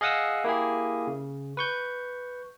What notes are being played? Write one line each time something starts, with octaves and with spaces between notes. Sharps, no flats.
G#4 D#5 F5 F#5 D#6 E6
A#3 E4 G4 G#4
C#3
B4 C#6 G6